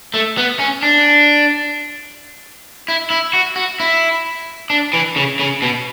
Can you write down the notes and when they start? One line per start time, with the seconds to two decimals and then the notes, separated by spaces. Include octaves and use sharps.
0.14 A3
0.38 B3
0.59 C#4
0.83 D4
2.88 E4
3.10 E4
3.33 F#4
3.56 F#4
3.80 E4
4.70 D4
4.93 E3
5.16 C#3
5.39 C#3
5.62 B2